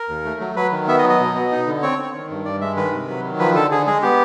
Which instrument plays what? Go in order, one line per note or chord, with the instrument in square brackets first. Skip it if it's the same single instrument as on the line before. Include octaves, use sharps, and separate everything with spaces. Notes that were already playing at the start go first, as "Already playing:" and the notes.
Already playing: [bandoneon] A#4
D#2
A3
F#3
F#3 B4
D#3
B3 E5
D#5
F#3
D#5
B2
B3
D#4
D3
C4 C#5
C4
D#3
G2
G2 D5
G#3 E5
D#3 B4
C3
F#3
D#3
F3 B4
D3 A4
D3 G#4
G#3 G#4
B3 G4